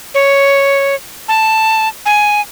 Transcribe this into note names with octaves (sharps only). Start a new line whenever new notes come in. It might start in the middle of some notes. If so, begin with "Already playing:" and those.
C#5
A5
G#5